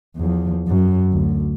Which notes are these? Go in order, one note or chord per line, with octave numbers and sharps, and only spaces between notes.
E2 F3
F#2
D2